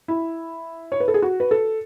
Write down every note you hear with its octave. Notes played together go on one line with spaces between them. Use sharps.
E4
C#5
B4
A4
G#4
F#4
B4
A4